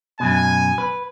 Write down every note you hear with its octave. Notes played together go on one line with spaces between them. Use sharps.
F#2 B2 G#5
B4